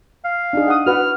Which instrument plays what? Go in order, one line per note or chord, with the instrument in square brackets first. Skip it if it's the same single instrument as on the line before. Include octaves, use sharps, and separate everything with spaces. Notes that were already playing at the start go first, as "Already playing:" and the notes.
[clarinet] F5
[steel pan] D4 D#4 G#4
F#5 D#6
[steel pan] F#4 B4 F#5 [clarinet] F6